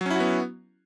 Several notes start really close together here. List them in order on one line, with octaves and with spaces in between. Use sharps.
F#3 C#4 E4 F#4 B3